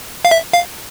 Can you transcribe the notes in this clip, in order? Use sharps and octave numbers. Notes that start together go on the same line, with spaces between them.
F5
E5
F5